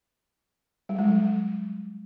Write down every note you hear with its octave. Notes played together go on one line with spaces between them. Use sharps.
G3
G#3
F#3